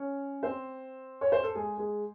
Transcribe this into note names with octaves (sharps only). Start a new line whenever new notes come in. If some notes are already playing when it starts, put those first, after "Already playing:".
Already playing: C#4 C#5
C4 C5
C#5
C5
A4
G#3 G#4
G#3 G#4